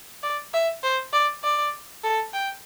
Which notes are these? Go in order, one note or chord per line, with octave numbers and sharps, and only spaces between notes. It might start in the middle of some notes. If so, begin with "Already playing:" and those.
D5
E5
C5
D5
D5
A4
G5